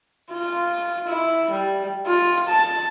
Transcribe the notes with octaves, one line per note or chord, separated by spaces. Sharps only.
F4
E4
G3
F4
A5